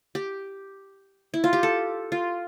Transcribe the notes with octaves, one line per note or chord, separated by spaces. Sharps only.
G4
E4
F4
G4
A4
F4